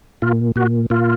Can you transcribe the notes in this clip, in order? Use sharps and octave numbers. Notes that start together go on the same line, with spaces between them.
A#2 F4
A#2 F#4
A#2 F4